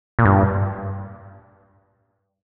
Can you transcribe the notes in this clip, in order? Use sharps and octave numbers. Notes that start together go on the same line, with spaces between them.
A#2
G2